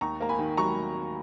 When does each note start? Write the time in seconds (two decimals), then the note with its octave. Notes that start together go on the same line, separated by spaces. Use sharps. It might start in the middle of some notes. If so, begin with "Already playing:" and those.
0.01 D#2 A#5 C#6
0.20 A#3 A#5
0.29 G#5 B5
0.39 D#3
0.57 F#3 A#5 C#6